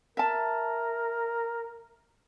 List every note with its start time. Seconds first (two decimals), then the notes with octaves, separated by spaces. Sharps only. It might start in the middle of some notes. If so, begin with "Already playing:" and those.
0.17 A#4 E5 A5